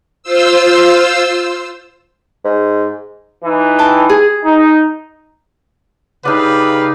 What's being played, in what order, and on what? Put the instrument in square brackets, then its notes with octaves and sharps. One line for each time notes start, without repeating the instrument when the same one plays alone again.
[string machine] F4 C5 E6
[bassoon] G#2
[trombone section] E3 D#4 E4
[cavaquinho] G5 A5
G#4
[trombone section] D#4
[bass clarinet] C#3 [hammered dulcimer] D#4 D5 [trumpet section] G4 B4 F5